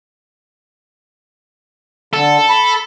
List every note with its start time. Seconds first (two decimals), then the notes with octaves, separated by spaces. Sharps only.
2.14 D3 A4
2.49 B5